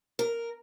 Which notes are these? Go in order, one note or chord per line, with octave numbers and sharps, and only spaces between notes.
A#4